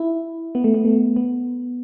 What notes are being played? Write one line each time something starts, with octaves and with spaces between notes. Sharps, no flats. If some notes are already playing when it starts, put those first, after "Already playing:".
Already playing: E4
B3
A3
B3
A3
B3